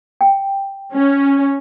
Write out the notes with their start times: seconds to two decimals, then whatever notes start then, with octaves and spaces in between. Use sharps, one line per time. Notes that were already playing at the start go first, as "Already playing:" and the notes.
0.21 G5
0.94 C#4